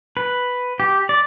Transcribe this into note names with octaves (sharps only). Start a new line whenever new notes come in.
B4
G4
D5